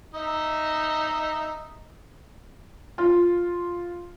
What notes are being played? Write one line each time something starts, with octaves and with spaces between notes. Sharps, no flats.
D#4 D#5 E5
F4